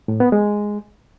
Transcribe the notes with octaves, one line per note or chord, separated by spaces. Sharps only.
A2
B3
G#3